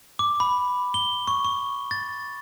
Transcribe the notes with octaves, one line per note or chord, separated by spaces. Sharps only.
D6
B5
G7
C#6
C#6
A6